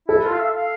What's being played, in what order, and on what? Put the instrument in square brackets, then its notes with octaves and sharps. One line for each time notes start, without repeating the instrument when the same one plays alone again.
[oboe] E4 [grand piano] A4
[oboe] F4
F5
E5
F5